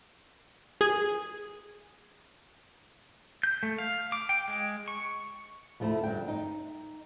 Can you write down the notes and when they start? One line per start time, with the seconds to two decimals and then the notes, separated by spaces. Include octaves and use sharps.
0.81 G#4
3.43 G6
3.63 A3
3.78 F5
4.12 D6
4.29 G5
4.48 G#3
4.88 C#6
5.80 D2 F3 A3 E4 A4
6.03 G2 D3 G5
6.28 D#4